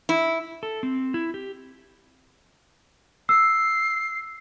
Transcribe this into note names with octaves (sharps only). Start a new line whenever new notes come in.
E4
A4
C4
E4
G4
E6 C7